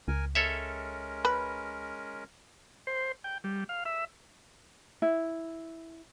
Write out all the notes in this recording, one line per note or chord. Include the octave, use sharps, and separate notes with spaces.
C#2 A#4 G#5
G#3 C#4 A4 A#4 C#5 E5
B4
C5
G5
G3
F5
E5
E4